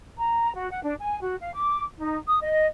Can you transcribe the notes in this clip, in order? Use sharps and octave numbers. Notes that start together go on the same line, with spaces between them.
A#5
F#4
F#5
D4
G#5
F#4
F5
D6
D#4
D#6
D#5